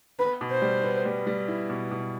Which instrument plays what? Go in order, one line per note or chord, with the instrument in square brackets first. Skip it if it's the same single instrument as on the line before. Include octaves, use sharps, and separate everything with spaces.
[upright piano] B3 [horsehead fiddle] B4
[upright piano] B2
[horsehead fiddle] C5
[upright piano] G3
B3
G3
G3
E4
B2
B2